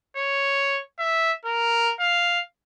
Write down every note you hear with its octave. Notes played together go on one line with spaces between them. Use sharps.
C#5
E5
A#4
F5